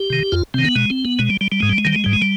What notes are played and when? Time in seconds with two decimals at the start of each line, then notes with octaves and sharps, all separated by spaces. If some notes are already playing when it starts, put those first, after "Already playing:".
Already playing: G4
0.10 C3 D#3
0.32 F2 F4
0.54 C3 D#3 C4
0.65 B3
0.76 B2 G#3
0.90 C4
1.05 B3
1.19 B2 G#3
1.30 G3
1.41 G3
1.52 G3
1.60 G#2 G#3
1.70 G3
1.78 G#3
1.85 D#3 G3
1.96 G#3
2.04 G#2 G3
2.13 G#3
2.22 G3